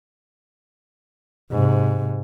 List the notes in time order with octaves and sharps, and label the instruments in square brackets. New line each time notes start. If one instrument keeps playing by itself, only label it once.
[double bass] G#2 C3